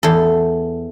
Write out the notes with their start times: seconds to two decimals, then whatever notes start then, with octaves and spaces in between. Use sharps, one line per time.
0.03 E2 A4